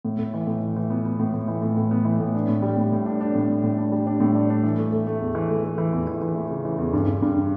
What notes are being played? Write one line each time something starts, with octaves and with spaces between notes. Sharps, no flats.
A2
A2
E3
A2
E3
E3
B3
B3
A2
A2
E3
A2
A2
B3
E3
A2
D4
A2
G3
A2
A2
D4
D4
A2
A2
A2
D4
G3
D4
A2
D4
D4
E3
A3
A3
A3
E2
E3
A3
A3
E3
E2
E3
E3
A3
C#3
E3
E2
G2
G2
G2